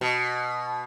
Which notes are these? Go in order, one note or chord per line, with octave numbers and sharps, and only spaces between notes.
B2